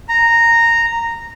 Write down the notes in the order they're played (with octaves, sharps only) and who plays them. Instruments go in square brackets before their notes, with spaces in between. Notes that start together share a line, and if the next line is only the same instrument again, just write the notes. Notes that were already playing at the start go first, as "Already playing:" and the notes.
[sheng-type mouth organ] A#5